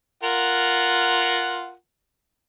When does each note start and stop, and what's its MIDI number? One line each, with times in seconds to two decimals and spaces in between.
0.23 1.73 65
0.23 1.73 70
0.23 1.73 78